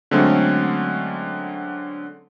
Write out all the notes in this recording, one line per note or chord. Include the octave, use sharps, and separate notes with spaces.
D3 F#3 G#3 A3 C4 C#4